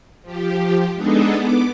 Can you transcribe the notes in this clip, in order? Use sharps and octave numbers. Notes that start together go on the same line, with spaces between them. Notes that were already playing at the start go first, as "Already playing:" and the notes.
F3 G4
G#3 B3 D4 D#4 G#4 A4
B3 D6